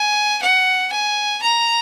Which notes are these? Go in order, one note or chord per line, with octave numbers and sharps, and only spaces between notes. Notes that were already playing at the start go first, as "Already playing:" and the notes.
Already playing: G#5
F#5
G#5
A#5